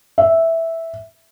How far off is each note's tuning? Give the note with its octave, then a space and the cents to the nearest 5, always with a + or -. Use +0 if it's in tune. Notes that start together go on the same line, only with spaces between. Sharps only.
E5 -5